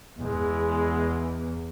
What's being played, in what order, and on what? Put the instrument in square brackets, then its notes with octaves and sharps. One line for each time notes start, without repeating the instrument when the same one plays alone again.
[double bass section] E2 [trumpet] G#3